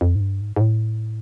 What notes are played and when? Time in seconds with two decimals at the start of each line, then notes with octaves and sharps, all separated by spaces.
0.01 F2
0.16 G#2
0.20 G2
0.41 G#2
0.56 G#2
0.61 A2